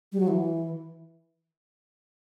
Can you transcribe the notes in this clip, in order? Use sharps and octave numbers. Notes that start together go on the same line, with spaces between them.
G3
F#3
E3